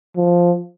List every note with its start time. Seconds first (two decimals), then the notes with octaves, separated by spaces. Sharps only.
0.17 F3